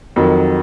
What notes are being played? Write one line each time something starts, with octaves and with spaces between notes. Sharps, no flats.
F2 D#3 F#3